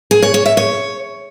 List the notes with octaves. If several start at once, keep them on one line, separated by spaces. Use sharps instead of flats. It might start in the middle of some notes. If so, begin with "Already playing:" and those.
G#4
C#5
C#5
E5
C#5